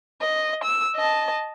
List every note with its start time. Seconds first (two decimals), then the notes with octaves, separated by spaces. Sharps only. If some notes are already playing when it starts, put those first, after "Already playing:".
0.22 D#5
0.64 E6
0.96 D#5 A5